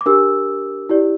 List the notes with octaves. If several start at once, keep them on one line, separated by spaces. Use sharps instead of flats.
D6
D4 G4 A#4 E6
E4 G4 D5